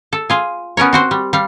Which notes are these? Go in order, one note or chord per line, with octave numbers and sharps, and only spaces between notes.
A4
F4 G#4
B3 C#4 A#4 C#5
C4 F#4 C5
G3
G3 F5